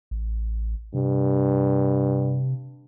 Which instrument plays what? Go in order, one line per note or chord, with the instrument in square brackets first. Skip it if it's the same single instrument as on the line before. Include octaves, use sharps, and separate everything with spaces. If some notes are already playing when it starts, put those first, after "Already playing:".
[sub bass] A1
[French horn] G2 [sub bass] C3